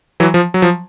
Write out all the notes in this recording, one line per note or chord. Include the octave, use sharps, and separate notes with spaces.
E3 F#3
F3
F#3
F3